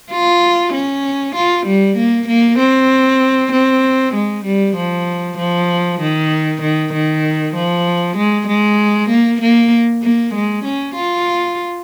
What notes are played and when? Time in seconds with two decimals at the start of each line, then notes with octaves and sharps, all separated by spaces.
0.12 F4
0.73 C#4
1.36 F4
1.66 G3
1.97 A#3
2.28 A#3
2.59 C4
3.52 C4
4.14 G#3
4.45 G3
4.76 F3
5.38 F3
6.01 D#3
6.62 D#3
6.93 D#3
7.55 F3
8.17 G#3
8.48 G#3
9.10 A#3
9.41 A#3
10.03 A#3
10.34 G#3
10.65 C#4
10.95 F4